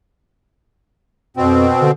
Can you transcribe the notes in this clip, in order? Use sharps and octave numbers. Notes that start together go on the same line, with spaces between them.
F2 B2 C4
D3